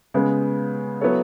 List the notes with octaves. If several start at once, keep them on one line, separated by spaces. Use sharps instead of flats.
C#3 G#3 B3
F#3 B3 E4 A4 C#5